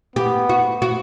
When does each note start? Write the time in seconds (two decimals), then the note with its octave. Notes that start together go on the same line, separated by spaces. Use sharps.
0.16 B3 G4
0.49 F#4
0.82 F#4